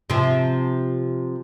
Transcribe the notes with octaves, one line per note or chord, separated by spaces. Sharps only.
C3 F3